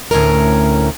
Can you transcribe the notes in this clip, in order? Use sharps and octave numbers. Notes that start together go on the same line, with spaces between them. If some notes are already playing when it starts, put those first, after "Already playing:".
D2 A2 C#3 C#4 A#4